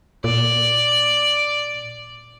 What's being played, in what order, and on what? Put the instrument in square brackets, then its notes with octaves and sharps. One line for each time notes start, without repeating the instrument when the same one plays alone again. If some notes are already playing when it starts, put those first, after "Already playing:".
[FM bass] A#2 [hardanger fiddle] D5